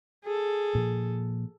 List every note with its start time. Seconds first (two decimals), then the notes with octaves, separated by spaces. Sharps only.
0.24 G#4 A4
0.75 A#2 F3